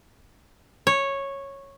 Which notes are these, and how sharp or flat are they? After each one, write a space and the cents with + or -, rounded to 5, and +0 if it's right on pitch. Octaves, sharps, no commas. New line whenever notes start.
C#5 -10